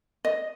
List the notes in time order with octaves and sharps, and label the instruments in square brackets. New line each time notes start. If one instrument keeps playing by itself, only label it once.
[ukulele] D#5